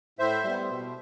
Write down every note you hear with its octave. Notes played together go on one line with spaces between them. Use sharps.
A2 C5 E5
G3 B3
B2